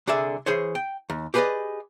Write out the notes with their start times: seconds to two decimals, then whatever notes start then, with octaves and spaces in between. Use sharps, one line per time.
0.07 C2 D3 G#4 D5 E5
0.46 E3 G#4 C5 C#5
0.75 G5
1.10 D#2
1.34 G4 G#4 B4 C5 D5 D#5